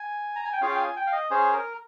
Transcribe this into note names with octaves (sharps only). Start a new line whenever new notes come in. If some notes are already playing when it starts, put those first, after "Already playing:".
Already playing: G#5
A#5
G#5
G5
C#4 F4 G#4 F5
G5
G#5
G5
F5
D#5
C#4 G#4 C5
A#4